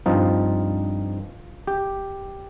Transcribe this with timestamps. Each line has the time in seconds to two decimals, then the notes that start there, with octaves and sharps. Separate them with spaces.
0.06 G2 F3 C4 D#4 F4
1.67 G4